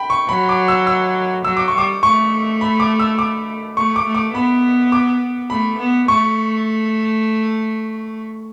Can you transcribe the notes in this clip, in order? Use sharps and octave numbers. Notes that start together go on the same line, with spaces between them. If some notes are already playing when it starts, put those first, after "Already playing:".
Already playing: G5 B5
C#6
F#3 B5
D6
E6
E6
F#3 E6
D6
C#6
G3 D6
A3 C#6
B5
D6
E6
D6
A3 C#6
D6
A3
D6
B3 B5
D6
A3 B5
B3
A3 C#6